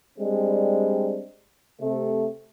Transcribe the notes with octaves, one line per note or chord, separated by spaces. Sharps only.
G3 G#3 C4 D4
C3 A3